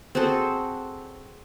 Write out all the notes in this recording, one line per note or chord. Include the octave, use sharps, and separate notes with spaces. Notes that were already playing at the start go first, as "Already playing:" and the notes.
C4 F#4 G#4 A4